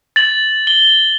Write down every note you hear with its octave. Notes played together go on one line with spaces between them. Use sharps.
A6 F#7
G7